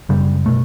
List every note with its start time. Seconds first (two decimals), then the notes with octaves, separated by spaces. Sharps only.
0.09 F#2 C#3 G3
0.46 B2 A3